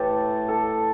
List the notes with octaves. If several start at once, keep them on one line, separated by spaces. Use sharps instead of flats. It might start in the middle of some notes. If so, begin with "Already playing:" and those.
Already playing: A2 E3 A3 G4 A4
A4